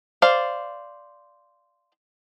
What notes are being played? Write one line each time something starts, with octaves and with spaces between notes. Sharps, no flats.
C5 D5 F5